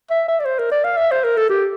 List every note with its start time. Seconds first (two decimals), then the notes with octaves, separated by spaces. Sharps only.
0.10 E5
0.28 E5
0.40 D5
0.45 C5
0.59 A#4
0.72 D5
0.84 F5
0.97 E5
1.11 C5
1.24 A#4
1.37 A4
1.50 G4